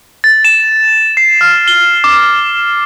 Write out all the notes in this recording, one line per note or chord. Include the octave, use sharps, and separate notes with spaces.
A6
E7
C7
F6
G7
D6